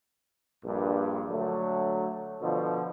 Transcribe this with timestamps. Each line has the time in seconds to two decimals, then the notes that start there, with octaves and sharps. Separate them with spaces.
0.65 A#1 G2
1.29 D3 F#3 A3
2.41 B2 D3 F3